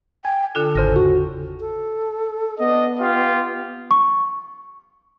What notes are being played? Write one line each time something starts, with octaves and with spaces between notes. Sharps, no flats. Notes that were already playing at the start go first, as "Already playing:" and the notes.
G5 G#5 G#6
D3 D4 F4 A4
G#1 E2 C#3 C5 A#6
F#4 C#6
A4
B3 D4 D#5
F4 G4 F5
C#6